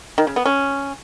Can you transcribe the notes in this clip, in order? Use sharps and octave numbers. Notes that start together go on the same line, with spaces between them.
D#3
C#3
B3
C#4